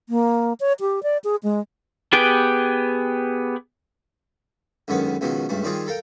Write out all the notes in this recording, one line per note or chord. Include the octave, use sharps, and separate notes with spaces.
A#3
C#5
G4
D5
G#4
G#3
B3 G4 G#4 B4 G5
C#2 F#2 D3 D#3 B3
C#2 B2 D#3 F3 F#3
C#2 G2 A3
D#3 G3 C4 F4 G#4 C5
A4 A#4 F5 G5